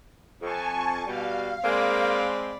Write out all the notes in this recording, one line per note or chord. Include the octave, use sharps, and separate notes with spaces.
F2 G#5 A5 C#6
B2 G3 F5
G#3 A#3 C4 D5 B5